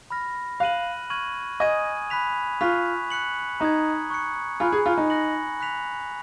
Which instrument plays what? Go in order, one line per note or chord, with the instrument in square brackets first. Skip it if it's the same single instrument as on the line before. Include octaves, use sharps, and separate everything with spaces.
[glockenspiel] B5 F6 A#6
[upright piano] F5 [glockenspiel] F#6 A#6 D#7 F#7
[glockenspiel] C#6 F6 G#6 D#7 F#7
[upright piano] D#5 [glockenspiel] G#5 D#6 G#6 D#7
[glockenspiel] B5 F#6 B6 F7
[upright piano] F4 [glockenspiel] C#6 F#6 B6 F7
[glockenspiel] F#6 C#7 F#7
[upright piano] D#4 [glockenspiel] A#5 D#6 G#6
[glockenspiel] C#6 F#6 C#7
[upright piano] F4 [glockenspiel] G#5 B5 F#6
[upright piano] G#4
F4
D#4
[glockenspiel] F#6 A#6 C#7 F#7
B5 F#6 B6 F7